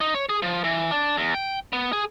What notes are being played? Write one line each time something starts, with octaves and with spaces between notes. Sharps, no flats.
D#4
C#5
G#4
F3
E3
D4
E2
G5
B3
G#4